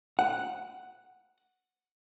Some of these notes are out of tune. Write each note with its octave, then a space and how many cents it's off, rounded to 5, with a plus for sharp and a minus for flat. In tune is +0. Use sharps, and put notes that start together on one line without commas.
F#5 +0